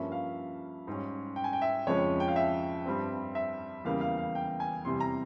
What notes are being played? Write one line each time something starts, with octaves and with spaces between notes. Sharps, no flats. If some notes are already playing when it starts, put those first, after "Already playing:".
Already playing: G2 F3 A#3 C#4 E5
F5
G#2 G3 C#4
G5
G#5
G5
E5
F2 C#3 F3 G#3 C#4 C#5
G5
F5
E5
G2 G3 C4
E5
E2 C#3 G3 A#3 F5
F5
F5
G5
G#5
E2 C3 G3 C6
A#5